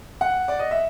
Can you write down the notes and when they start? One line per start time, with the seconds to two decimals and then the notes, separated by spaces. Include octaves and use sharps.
0.21 F#5
0.48 D5
0.59 D#5
0.71 E5